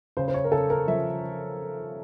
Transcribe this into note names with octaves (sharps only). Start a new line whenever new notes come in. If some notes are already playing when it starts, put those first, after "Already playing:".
C#3 C5
C5
C#5
A#4
C#3 A4
A#4
F3 E5